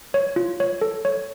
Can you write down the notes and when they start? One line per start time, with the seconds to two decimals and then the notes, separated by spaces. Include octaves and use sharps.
0.14 C#5
0.36 F4
0.60 C#5
0.81 A4
1.05 C#5